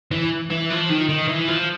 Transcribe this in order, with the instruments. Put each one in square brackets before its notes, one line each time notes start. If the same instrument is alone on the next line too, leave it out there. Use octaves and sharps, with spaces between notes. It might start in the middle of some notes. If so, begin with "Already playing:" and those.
[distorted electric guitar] E3
E3
F3
D#3
D#3
E3
F3